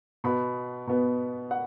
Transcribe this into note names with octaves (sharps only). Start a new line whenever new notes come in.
B2 B3 B5
B2 B3
F#5